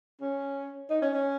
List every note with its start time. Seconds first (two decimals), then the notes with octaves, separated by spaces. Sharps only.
0.21 C#4
0.90 D#4
1.02 C#4
1.13 C#4